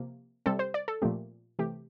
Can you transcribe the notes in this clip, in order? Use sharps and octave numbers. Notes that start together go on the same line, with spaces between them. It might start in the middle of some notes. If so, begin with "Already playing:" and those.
Already playing: C3 F3 A#3
C3 G3 C4 A4
C5
D5
A4
A#2 F3 A3 C4 G4
C3 E3 A3 G4